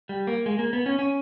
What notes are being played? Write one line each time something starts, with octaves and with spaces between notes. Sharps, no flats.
G3
A#3
G#3
A#3
B3
C#4
C#4